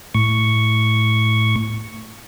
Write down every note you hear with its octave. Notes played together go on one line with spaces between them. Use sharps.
A2 C#6